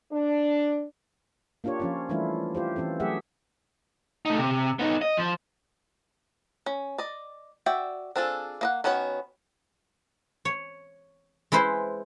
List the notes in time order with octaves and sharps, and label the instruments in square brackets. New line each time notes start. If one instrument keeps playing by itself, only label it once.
[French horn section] D4
[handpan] A#3 D4 F4 G4 C#5
F3 C#4 F4
E3 G3 A3 D4 E4 F4
F4 G4 C5
E3 C4 C#4 A4
F#3 A3 G4 G#4 E5 F#5
[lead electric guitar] A3 D#4
C3
B3 D#4
D#5
F3
[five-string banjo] C#4
D5 D#5
F#4 D5 E5 G5
C4 D4 F4 G#4 A4
A#3 D#5 F#5
D#3 B3 C#4 F#4 C#5
[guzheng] C#5
G#3 E4 B4 C5